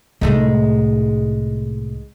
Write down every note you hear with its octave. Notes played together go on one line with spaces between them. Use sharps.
C2 A2 G#3 A3 D#4